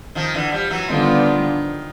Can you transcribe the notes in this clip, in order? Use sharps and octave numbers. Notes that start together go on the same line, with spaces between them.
D#3 F3
D3 E3
F3 G3
E3 F#3
D3 D#3 F3 G3 B3 D4 F4